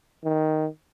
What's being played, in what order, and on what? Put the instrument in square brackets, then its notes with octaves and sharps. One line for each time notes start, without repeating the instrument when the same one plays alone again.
[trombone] D#3